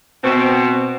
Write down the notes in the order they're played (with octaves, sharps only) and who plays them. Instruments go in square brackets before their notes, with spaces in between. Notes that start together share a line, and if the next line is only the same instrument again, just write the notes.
[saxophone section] B2 C4